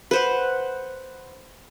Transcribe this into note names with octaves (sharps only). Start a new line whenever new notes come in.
B4 C5 F#5